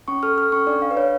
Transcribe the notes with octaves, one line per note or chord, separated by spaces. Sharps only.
C#4 C#6
A4 F6
A4 F6
C#4 C#6
D4 D5
D4 F5
B4
D4 C#5